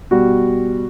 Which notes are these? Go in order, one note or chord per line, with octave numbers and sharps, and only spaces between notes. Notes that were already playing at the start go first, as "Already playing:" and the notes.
B2 G3 F#4